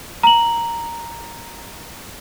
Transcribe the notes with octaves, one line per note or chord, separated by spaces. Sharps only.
A#5 F#7